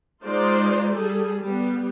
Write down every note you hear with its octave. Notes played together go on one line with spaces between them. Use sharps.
G#3 D#4 F4 C5 D5
G3 G#4 A4
G3 B3